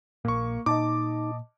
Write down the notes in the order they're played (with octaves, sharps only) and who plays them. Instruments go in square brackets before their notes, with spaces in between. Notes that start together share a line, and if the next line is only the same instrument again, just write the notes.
[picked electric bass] A#1 A#2 [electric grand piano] A#3 C#6
[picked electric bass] A#2 [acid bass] D#4 [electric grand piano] D#5 A5 D6